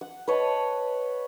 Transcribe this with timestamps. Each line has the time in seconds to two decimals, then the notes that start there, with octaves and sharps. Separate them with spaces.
0.01 F#5
0.28 B4 C#5 D#5 A5